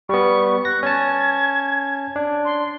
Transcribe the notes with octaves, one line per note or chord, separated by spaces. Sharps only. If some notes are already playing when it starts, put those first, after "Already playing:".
G3 B3 C#6
F#6 A#6
C#4 A5 G#6
D4
C6